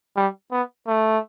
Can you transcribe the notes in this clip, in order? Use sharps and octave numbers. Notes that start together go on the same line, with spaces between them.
G3
B3
A3